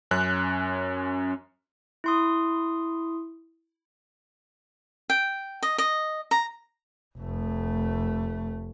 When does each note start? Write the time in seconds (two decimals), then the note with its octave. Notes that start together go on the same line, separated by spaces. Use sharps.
0.11 F#2 C#4 F#6
2.04 E4 C6 D#6
5.10 G5
5.62 D#5
5.78 D#5
6.31 A#5
7.18 F1 A3